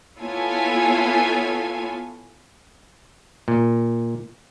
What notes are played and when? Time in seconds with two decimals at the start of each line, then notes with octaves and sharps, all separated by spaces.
0.20 B3 E4 F4 A4 C#5 G#5
3.48 A#2